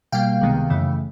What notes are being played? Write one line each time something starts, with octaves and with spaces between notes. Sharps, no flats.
B2 G3 A#3 F5 G5
C#2 C3 D#3 G#3 B3
F#2 C#3 E3 A3